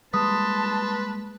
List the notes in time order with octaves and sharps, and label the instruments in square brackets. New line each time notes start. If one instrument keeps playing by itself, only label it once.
[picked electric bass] G3 G#3 A#3 [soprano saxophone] B4 [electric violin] A5 C6 [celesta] D#6